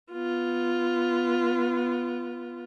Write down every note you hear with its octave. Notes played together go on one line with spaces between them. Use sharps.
B3 F4